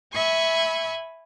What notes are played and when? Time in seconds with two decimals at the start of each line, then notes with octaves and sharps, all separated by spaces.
0.14 E5 G#5 B5 C#6